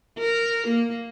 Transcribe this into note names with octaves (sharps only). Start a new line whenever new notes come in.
A#4
A#3